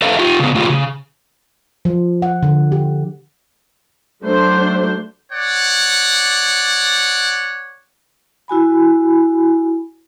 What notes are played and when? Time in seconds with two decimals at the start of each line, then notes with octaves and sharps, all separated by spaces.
0.02 A4 B4 C5 E5 F5
0.19 F4 G4
0.40 C#3 B3
0.55 A3 F4 G4 G#4
0.69 C#3
1.85 F3
2.22 F#5
2.43 D3
2.72 G4
4.24 F#3 A3 D4 C5
5.32 C#5 D5 F#5
8.48 E4 F#4 G#5 B5